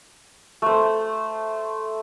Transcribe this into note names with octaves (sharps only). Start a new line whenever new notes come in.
A3 C5